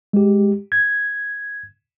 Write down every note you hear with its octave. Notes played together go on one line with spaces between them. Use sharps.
G#3 G4
G#6